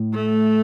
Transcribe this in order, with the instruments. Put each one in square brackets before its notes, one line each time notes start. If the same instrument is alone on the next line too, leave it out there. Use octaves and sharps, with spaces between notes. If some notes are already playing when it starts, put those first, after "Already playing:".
Already playing: [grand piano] A2
[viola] A3